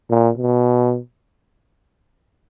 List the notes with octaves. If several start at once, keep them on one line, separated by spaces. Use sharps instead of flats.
A#2
B2